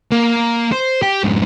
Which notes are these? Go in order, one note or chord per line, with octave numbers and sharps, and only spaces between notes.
A#3
C5
G4
F2 G#2